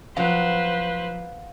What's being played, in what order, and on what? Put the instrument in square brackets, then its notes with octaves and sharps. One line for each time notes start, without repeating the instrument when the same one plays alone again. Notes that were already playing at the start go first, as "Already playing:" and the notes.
[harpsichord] F3 F#3 [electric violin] B4 C5 [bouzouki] F5 F#5